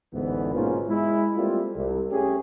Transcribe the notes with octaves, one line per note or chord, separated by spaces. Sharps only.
A1 D2 G#2 D3 E3 B3
G#2 B2 A#3 C#4 D#4 F4
G#3 E4
G3 A3 A#3 C4 F4
C2
A3 C#4 G4 G#4